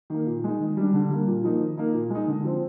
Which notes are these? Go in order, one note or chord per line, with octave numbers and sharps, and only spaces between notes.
D#3 A#3
A#2
G#3 D#4
D#3
G3 D4
D3
G3 A#3
A#2
F3 A#3 D#4
D#3
A#3 D#4
A#2
G#3 D#4
D3
F3 C4